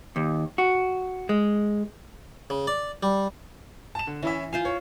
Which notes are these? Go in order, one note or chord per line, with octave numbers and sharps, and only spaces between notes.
D#2
F#4
G#3
C#3
D5
G3
A5 E7
D3
E3 C#4 E4 E5
F4 C5 F5 G#5
C#5